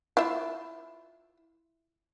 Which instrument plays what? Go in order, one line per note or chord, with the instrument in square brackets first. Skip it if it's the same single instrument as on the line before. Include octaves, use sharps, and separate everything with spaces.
[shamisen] E4 F4 E5